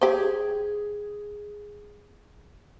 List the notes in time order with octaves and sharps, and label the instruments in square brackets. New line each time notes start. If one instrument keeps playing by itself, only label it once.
[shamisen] G4 C5 [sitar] G#4